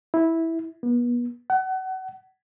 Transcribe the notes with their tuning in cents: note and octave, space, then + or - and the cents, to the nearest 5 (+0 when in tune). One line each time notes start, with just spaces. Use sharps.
E4 -10
B3 -35
F#5 +30